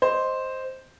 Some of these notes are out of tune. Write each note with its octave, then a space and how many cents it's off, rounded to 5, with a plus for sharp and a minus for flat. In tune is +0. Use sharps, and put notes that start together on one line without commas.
C5 +0 D#5 +0